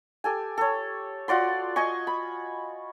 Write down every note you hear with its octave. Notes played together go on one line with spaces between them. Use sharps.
G4 A4 G#5
A4 C#5
F4 F#4 D5 C6
D#5 G#5 C#6
B5